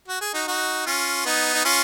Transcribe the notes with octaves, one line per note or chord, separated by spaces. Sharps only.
F#4
G#4
D#4 F#4
D#4 F#4
C#4 F4
B3 D#4
D#4
C#4 F4